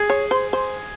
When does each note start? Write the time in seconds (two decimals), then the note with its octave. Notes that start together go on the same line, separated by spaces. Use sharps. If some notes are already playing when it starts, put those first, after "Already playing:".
Already playing: G#4
0.10 C#5
0.31 C5
0.53 C5